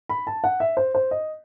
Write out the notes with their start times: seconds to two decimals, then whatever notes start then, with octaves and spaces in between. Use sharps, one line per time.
0.09 B5
0.27 A5
0.44 F#5
0.60 E5
0.77 C5
0.95 C5
1.11 D#5